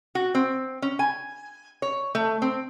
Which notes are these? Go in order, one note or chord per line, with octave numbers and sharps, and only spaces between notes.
F#4
C4
C#4
G#5
C#5
A3
C4